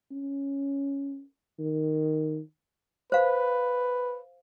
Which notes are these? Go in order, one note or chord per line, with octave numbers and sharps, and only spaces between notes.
C#4
D#3
B4 C5 F5